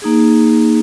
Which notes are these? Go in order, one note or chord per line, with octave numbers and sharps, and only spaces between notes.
A#3 D#4 G#4